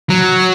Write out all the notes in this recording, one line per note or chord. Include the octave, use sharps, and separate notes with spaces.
F#3